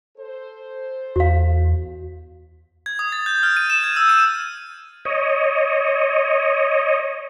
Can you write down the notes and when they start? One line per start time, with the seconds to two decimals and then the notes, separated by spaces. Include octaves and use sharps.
0.17 A4 C5
1.16 E2 F#4 F5
2.86 G#6
2.99 D#6
3.12 A6
3.26 G6
3.43 F6
3.57 D#7
3.70 E7
3.84 G#6
3.96 E6
4.09 D#7
5.05 C#5 D#5